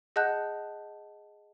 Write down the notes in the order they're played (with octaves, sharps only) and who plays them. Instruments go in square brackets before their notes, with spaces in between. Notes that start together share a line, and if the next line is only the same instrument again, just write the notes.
[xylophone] G#4 D#5 F#5 A5 F#6 G6